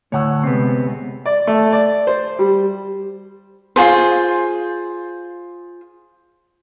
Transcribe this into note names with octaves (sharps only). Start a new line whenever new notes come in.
D2 A2 C#5 F#5 E6
C3 G#3 B3 C4
D5
A3
D5
C5
G3
F4 F#4 G#4 C5